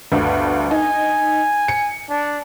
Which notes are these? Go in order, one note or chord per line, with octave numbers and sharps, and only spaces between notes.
G1 D2
D#4 G#5
C#7
D4